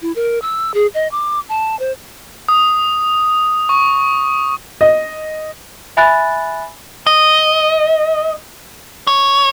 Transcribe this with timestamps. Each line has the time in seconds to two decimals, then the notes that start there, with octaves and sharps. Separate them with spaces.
0.02 E4
0.16 A#4
0.42 E6
0.74 G#4
0.94 D#5
1.12 D6
1.49 A5
1.79 C5
2.48 D#6
3.69 C#6
4.81 D#5
5.97 E5 G#5 B5 F#6 A6
7.07 D#5
9.07 C#5